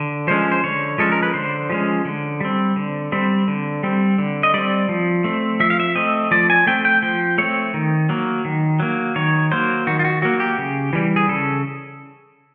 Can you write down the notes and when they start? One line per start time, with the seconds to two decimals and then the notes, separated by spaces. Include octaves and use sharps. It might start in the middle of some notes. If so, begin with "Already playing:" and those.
Already playing: D3
0.27 F3 G#3 C#4 C5
0.52 C5
0.64 D3 C#5
0.98 F3 G#3 C#4 A4
1.12 A#4
1.23 B4
1.34 D3 C5
1.70 F3 G#3 C#4
2.05 D3
2.41 G3 C4
2.76 D3
3.12 G3 C4
3.48 D3
3.83 G3 C4
4.18 D3
4.43 D#5
4.54 G3 C4 D5
4.89 F3
5.24 A3 C4
5.60 F3 E5
5.70 F5
5.80 E5
5.95 A3 C4 D#5
6.31 F3 D5
6.50 G#5
6.67 A3 C4 G5
6.85 G5
7.03 F3 G5
7.38 A3 C4 C#5
7.74 D#3
8.09 F#3 A#3
8.45 D#3
8.80 F#3 A#3
9.16 D#3 C#5
9.51 F#3 A#3 C5
9.87 D#3 F#4
9.99 F4
10.05 F#4
10.22 F#3 A#3 F#4
10.40 G4
10.58 C#3
10.93 E3 G3
11.16 G#4
11.28 C#3 A4